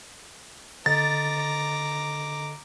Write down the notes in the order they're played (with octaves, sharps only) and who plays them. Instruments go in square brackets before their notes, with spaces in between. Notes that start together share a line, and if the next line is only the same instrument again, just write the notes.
[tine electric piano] D3 A4 D#5 [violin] A#5 D6 [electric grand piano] A6